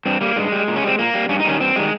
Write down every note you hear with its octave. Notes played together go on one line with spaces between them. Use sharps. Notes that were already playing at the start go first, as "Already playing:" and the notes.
G2 C4
G3 A#3
G2 G#3
G3
A#2
C#4
G3 C4
A#2 A#3
G3
G2 C#4
D#4
D#3 G3 C#4
G2 C4
D#3 G3 G#3